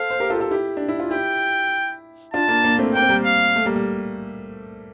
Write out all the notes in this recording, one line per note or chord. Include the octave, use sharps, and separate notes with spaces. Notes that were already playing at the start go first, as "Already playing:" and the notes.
Already playing: A4 C5 F5
C5
G4 A#4
F4 A4
G4
F4 A4
E4 G4
D4
E4
F4
E4 G4 G5
D4 F4 A5
A#3 D4
A#3 D4
A3 C4
A#3 G5
C4
G3 A#3
F5
A3
G3 A#3
G3